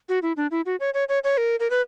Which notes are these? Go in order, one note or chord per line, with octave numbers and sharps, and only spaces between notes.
F#4
E4
D4
E4
F#4
C#5
C#5
C#5
C#5
A#4
A#4
B4